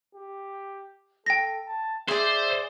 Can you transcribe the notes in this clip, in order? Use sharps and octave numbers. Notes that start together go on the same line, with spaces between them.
G4
A4 G5 A#6
A5
G#4 C5 D5 E5